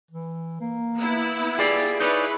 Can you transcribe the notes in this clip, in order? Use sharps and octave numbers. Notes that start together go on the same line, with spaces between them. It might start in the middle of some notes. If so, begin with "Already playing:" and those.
E3
A#3
B3 E4
F4 G4 G#4 D5
D#4 E4 B4 C#5 D5